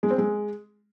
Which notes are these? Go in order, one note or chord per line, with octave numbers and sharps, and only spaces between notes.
G#3
C4
G#3